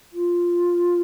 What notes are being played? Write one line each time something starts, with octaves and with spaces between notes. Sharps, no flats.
F4